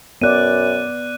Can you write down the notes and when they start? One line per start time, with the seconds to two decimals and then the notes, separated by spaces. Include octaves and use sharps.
0.21 F#2 B3 D5 F#6 D#7